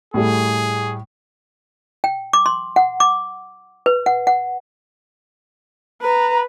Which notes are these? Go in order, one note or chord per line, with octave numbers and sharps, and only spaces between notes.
A2 G3 A3 G#4
G5
D6
C6
F#5
D6
B4
F#5
F#5
B4 A#5